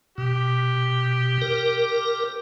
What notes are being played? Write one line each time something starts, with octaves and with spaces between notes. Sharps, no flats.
B2 G4
A#4